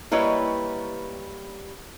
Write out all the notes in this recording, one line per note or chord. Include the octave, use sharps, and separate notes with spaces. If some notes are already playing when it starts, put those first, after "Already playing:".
G3 A#3 E4 B4 C#5 D#5